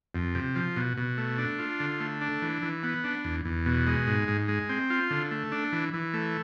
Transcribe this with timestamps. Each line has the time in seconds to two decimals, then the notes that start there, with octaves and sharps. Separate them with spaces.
0.15 F2
0.35 C3
0.55 F3
0.76 B2
0.97 B2
1.18 A3
1.38 D4
1.59 F4
1.80 D3
2.00 A3
2.21 D4
2.42 E3
2.62 E3
2.83 B3
3.04 D4
3.24 E2
3.45 E2
3.66 B2
3.87 G#3
4.07 G#2
4.28 G#2
4.48 G#3
4.69 C4
4.90 F4
5.10 D3
5.31 A3
5.52 D4
5.72 E3
5.93 E3
6.14 A3